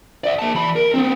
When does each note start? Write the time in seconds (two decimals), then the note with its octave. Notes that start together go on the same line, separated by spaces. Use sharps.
0.24 D5 E5
0.39 A#3 A5
0.55 E3 B5
0.76 A#4
0.94 B3 C4